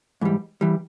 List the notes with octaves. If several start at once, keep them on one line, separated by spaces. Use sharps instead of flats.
G#2 E3 G3
E3 G3